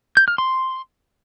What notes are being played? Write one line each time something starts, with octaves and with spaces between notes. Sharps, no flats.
G6
F6
C6